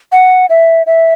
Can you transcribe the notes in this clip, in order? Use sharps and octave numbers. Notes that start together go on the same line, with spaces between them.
F#5
E5
E5